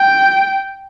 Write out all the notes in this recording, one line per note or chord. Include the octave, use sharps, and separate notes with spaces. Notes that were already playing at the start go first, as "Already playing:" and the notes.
Already playing: G5